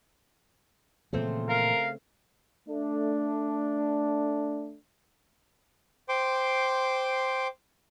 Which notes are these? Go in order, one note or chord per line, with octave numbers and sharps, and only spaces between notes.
A#2 C#3 E3 F3 A3 C4
A#4 F5
A3 D4
C5 G5 C6 D6